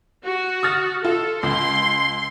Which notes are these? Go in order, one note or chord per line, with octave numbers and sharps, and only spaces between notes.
F#4
D#6 F6 A6
F4 A4
C#2 C6